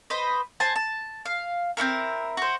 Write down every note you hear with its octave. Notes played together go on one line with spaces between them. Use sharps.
B4 C5 D#5 B5
C5 G#5 A5
A5
F5
C4 C#4 E4 A#4
F#4 C5